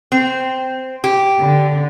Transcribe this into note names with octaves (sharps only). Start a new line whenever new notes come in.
C4
G4
D3